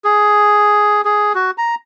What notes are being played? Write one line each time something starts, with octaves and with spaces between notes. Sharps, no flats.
G#4
G#4
F#4
A#5